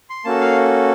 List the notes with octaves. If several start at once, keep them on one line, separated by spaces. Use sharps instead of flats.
C6
A#3 C#4 F#4 A4 A5
F5